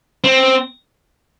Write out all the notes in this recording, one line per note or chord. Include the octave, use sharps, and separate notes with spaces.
C4